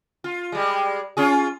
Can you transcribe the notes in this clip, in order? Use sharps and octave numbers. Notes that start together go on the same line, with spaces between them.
F4
G3 G#3
C#4 F4 G#4